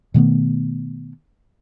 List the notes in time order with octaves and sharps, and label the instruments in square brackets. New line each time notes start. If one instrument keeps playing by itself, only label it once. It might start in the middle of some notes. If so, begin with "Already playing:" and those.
[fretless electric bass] B2 D#3 A3 B3